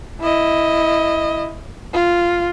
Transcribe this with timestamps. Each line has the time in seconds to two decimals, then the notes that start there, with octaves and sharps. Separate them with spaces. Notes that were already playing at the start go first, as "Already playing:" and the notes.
0.21 E4 D#5
1.93 F4